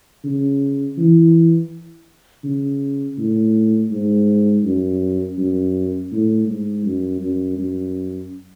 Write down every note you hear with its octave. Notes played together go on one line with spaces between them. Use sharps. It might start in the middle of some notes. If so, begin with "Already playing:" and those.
C#3
E3
C#3
A2
G#2
F#2
F#2
A2
G#2
F#2
F#2
F#2